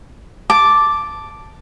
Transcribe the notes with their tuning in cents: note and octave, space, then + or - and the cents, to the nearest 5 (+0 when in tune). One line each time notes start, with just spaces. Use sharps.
A5 +0 D6 +0